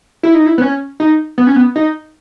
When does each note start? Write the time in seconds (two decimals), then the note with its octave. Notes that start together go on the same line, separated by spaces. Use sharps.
0.23 E4
0.35 D#4
0.46 E4
0.58 B3
0.61 C#4
1.00 D#4
1.38 B3
1.47 C#4
1.56 B3
1.76 D#4